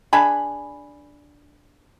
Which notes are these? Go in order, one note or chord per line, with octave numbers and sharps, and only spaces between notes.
D4 G#4 B5